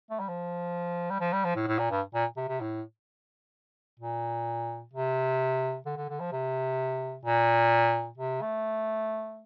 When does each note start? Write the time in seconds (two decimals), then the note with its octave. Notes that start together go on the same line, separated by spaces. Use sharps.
0.10 A3
0.19 G3
0.28 F3
1.10 G3
1.20 F3
1.33 G3
1.44 F3
1.55 A2
1.67 A2
1.79 A#2
1.90 G2
2.14 A#2
2.36 C3
2.48 C3
2.61 A2
3.99 A#2
4.93 C3
5.86 D3
5.97 D3
6.09 D3
6.20 F3
6.32 C3
7.25 A#2
8.17 C3
8.41 A3